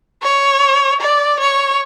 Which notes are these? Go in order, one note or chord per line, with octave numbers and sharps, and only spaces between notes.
C#5
D5
C#5